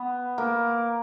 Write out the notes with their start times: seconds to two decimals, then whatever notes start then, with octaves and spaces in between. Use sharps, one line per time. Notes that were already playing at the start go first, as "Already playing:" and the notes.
Already playing: B3
0.38 A#3